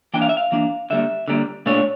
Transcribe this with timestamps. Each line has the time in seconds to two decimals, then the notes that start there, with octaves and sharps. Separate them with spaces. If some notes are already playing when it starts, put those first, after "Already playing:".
0.14 E3 A#3 D4 G5
0.22 F5
0.29 E5
0.37 F5
0.52 E3 A#3 D4
0.90 D3 G3 A#3 E5
1.28 D3 G3 A#3
1.66 A#2 A3 D4 C#5